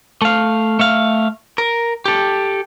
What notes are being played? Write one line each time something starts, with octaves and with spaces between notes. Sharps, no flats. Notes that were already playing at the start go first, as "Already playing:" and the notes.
A3 F5
A3 F5
A#4
G4 A4